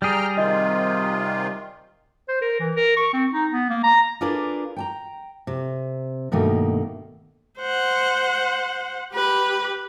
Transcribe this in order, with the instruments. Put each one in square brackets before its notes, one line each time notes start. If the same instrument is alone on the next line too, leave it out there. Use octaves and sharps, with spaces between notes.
[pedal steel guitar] G3 G#4 [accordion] G5 A#5 F6
[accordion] C3 D#3 F4 [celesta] D#5
[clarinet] C5
A#4
E3
A#4
C#6
C4
D#4
B3
A#3
A#5
[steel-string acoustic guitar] D4 F4 G#4 A#4 B4 D5
G5 A5 A#5
C3
G2 B2 D#3 A3 A#3
[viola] C5 F#5
G4 B4